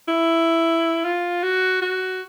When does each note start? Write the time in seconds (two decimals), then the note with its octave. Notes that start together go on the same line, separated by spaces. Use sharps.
0.08 E4
1.05 F4
1.43 F#4
1.82 F#4